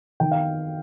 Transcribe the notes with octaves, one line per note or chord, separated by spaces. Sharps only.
D#3 G5
F5